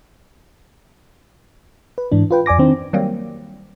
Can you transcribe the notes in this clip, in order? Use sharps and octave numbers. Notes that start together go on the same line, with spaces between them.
B4
G#2 E3 D4
F4 B4 G5
F2 D5 G#5 D6 A#6
D#3 C4 D4 D#4
D#3 F#3 G3 A#3 C4